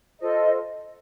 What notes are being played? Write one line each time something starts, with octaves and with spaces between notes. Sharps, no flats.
F4 A4 C5 D#5